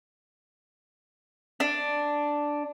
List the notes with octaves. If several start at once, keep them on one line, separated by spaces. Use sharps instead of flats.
D4